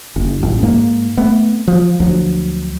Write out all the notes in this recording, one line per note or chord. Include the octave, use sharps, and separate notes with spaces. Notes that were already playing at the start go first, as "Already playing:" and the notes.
F#1
A1
G#2 G#3 A#3
A3 B3 C4
F3
D2 F3 F#3